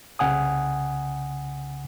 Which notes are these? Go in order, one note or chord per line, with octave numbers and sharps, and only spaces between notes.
C2 C#3 F#5 G#5 D#6